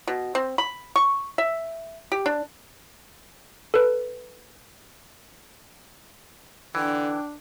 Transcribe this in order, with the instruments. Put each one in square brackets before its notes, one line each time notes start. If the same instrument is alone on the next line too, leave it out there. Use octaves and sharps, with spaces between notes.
[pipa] B2
C4
B5
C#6
E5
G4
D4
[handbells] A4 B4
[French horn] D3 [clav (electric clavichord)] E3 [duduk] D4 [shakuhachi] G5